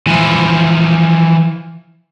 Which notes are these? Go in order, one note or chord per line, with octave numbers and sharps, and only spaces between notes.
E3 F3